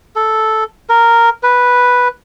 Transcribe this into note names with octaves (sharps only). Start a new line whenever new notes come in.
A4
A#4
B4